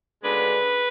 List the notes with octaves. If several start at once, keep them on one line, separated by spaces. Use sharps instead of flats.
D2 C#3 G#3 B3 D4 B4